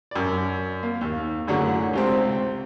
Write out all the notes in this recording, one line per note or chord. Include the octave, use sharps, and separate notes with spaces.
F#2 D5
A#3
D#2
F#2 A2 D3 F#3 G#4 C#5
C#2 C3 C4